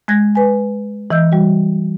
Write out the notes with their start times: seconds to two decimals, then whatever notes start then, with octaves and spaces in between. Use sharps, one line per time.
0.08 G#3 F#6 G#6 A#6
0.35 B4 G#5
1.10 E3 D#5 E6 G6
1.32 G3 F#4